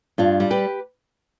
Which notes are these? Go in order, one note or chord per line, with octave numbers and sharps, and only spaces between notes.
G2 D4 F4
G3
G4 B4